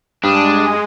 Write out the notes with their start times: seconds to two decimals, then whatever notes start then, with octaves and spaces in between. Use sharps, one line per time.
0.24 G2 G#3 D4 D#6